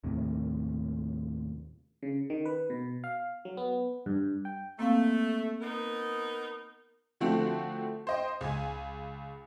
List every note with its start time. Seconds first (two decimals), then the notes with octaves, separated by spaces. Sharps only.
0.04 D#2 A2 C3
2.03 C#3
2.30 D#3
2.46 B4
2.70 B2
3.04 F5
3.45 F#3
3.57 B3
4.06 G2
4.45 G5
4.79 A3 A#3 C4 F5
5.61 B3 D#4 A#4
7.21 D3 F3 A3 C4 F#4
8.07 C5 D#5 G5
8.41 C#2 G#5